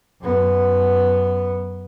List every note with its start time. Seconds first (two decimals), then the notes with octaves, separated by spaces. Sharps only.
0.21 F#2 B3